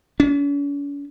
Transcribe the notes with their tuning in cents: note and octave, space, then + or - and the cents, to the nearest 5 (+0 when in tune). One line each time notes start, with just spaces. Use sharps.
C#4 +45